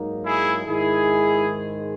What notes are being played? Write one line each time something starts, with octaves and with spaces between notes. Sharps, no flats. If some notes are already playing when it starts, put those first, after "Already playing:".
Already playing: G#2 F#3 A#3 D#4
E4 G#4
G#2 D#3 G#3 E4 G#4